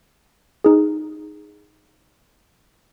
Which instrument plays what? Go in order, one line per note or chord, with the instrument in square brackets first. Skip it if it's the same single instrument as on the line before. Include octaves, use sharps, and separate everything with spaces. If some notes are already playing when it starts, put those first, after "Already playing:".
[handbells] D#4 G#4